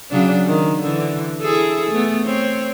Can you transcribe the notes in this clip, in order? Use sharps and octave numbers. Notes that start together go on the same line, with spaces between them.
C#3 F#3 D4
D#3
D3 E3
E4 G#4 A4
A3 B3
C4 C#5